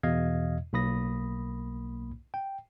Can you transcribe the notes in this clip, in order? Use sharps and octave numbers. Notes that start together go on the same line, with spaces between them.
E2 B2 D#5 F5 G#6
B1 A#3 B5 D#6 A#6
G5